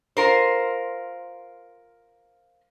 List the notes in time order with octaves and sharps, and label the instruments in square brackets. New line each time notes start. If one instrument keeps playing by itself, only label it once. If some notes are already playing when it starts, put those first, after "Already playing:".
[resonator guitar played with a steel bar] F4 A#4 C5